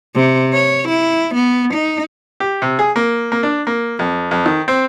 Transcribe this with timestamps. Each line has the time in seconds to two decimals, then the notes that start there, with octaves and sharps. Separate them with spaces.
0.15 C3
0.53 C#5
0.88 E4
1.35 B3
1.74 D#4
2.40 G4
2.62 C3
2.79 G#4
2.96 A#3
3.32 A#3
3.43 D4
3.67 A#3
3.99 F2
4.31 F2
4.46 D#3
4.68 C4